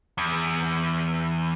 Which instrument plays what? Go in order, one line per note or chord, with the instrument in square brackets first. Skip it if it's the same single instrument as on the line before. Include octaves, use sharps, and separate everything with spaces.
[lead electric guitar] E2